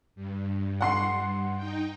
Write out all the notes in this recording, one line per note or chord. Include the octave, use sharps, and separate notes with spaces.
G2
F#5 C6 C7
D#4 G5